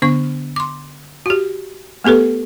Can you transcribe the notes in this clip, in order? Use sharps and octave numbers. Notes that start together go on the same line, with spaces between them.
D3 B3 D4 C#6
C6 D6
F#4 G4
A3 B3 G4 A4 B4